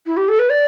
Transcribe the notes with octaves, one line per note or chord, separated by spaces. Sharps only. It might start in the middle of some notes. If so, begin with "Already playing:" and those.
E4
G4
A4
B4
D5